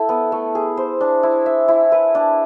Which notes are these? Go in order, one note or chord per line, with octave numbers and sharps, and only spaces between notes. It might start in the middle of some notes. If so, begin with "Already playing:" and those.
Already playing: E4 A4
B3
A3
G#4
C5
D4
E4
E5
E4
B4
D4